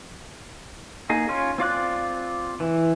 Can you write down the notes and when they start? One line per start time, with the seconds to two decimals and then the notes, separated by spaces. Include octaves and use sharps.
1.09 A#3 D#4 G#4
1.29 C#4 F4
1.58 C4 F4 D5 F#6
2.60 E3